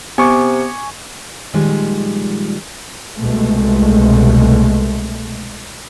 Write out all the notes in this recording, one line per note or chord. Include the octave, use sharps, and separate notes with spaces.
C3 B3 G#5 C#6 D6
A#2 D#3 F3 G3 G#3
C2 B2 G#3 A3